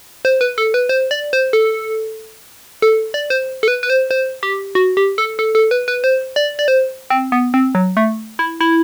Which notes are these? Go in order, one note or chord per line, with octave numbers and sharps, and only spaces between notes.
C5
B4
A4
B4
C5
D5
C5
A4
A4
D5
C5
A4
B4
B4
C5
C5
G4
F#4
G4
A4
A4
A4
B4
B4
C5
D5
D5
C5
C4
B3
C4
F#3
A3
E4
E4